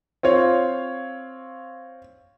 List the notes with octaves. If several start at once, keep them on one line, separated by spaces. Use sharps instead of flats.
C4 F4 C#5 F5